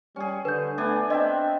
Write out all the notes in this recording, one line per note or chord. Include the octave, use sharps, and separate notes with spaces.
G3 C#4 G#4
D3 B4 G6
A3 B3 D4 G#5
C4 D4 D#5 E5 G5